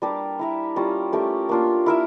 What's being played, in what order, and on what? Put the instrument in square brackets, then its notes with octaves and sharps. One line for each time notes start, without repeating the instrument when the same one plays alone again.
[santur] G3 D4 G4 A#4
E4 A#4 E5
G3 C#4 F4 A#4
A3 C#4 G4 A#4
A#3 D4 F4
E4 A#4 E5